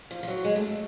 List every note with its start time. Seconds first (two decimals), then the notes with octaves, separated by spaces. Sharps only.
0.11 F3
0.23 F3
0.28 F#3
0.45 G#3
0.56 A3
0.67 A3